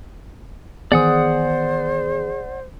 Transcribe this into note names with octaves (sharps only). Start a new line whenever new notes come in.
D#3 E3 B3 G#4 C5 D5 F#5 D#6